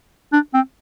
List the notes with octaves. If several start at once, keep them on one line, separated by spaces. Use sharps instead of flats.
D4
C4